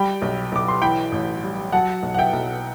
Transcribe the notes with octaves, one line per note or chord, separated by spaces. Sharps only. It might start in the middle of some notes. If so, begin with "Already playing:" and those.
Already playing: G3 G5 B5
B1
B1 D6
C6
E3 G5 B5
A1
G3
F#3 F#5 A5
B1
F#5
E5 G5
B1